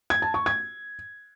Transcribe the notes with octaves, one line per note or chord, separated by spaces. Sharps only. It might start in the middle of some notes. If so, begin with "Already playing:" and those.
G#6
A5
C#6
G#6